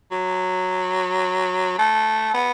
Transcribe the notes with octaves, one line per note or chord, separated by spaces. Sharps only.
F#3
A3
B3